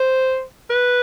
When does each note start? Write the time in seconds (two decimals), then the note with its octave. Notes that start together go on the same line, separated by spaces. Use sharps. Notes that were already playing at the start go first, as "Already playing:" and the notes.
Already playing: C5
0.70 B4